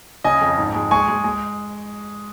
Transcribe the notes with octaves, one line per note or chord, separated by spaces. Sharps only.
C#3 D#5 G#5
F2
G#2
G#3
G#3 G#5 C#6
G#3
G#3